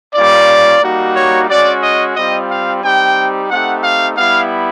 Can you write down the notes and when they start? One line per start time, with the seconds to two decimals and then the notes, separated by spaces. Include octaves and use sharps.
0.14 G3 A#3 C#4 F4 D5
0.81 G3 A#3 D#4 F#4
1.15 C#5
1.48 G#3 C#4 F#4 D5
1.82 D#5
2.15 G3 C4 F4 D#5
2.50 F5
2.83 G3 C4 D#4 G4 G5
3.50 A3 C4 D#4 G4 F#5
3.84 F5
4.17 G3 B3 E4 F5